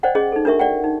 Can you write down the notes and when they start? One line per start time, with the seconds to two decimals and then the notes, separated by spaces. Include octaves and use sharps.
0.03 C5 D5 D#5 F#5 G5
0.15 C#4 G#4 D#5 C6
0.32 D#4 A4
0.45 D4 F#4 A#4 E5 C#6
0.59 D5 F#5 G5
0.84 D#4